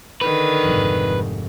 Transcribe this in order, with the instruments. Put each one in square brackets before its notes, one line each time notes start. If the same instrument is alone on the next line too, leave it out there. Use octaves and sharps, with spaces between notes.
[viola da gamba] D3 D#3 [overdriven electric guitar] B4
[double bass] F1 G#2